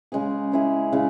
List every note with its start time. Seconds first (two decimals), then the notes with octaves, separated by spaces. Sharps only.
0.12 C#3 G#3 C#4 G#4
0.52 G#3 C#4 E4 G#4
0.92 C#3 G#3 E4